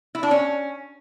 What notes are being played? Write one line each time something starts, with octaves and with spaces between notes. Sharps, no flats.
E4
D4
C#4